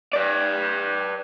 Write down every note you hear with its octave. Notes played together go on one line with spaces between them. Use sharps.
B4 D5